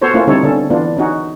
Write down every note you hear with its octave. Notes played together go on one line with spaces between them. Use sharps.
B3 F#4 A4 C5 C#5
A3 A#3 C#4 E4 F4
D3 G3 C4 D#4 A4 C#5
D3 B3 C#4 A4
E3 B3 D4 F4
C#4 D#4 F#4